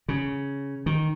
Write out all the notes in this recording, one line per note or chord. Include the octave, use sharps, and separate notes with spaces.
C#3
D#3